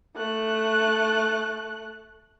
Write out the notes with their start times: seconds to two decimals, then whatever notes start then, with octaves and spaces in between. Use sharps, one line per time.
0.16 A3 F#6